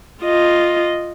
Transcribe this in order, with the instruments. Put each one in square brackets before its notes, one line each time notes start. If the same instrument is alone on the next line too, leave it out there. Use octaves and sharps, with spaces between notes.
[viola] F4 D#5